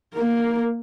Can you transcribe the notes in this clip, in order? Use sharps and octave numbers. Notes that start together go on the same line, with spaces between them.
A#3 A#4